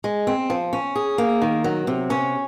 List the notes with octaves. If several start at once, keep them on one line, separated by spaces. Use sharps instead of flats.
G#3
C4
F3
C#4
G#4
A#3
D#3
F#3
C3
C#4